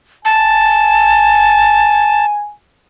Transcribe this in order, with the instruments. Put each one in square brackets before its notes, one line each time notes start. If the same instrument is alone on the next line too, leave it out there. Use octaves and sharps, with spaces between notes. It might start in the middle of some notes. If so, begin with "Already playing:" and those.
[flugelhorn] G#5 [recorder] A5